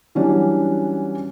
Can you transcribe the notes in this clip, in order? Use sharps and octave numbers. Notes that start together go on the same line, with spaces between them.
E3 F#3 G3 C#4 D4 F#4